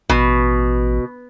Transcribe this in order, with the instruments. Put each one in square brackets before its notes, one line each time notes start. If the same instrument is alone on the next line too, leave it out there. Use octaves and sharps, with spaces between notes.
[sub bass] A1 [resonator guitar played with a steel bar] B2